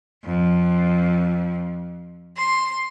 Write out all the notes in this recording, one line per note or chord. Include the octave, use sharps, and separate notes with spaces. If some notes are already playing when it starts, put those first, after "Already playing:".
F2
C6